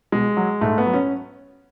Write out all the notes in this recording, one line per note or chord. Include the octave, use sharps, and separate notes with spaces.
B2 G#3
F#3
G#2 A3
B3
F#3
C#4